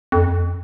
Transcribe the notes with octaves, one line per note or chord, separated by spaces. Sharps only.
F2